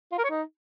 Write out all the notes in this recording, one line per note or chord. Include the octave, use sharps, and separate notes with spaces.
F4
A#4
C#5
D#4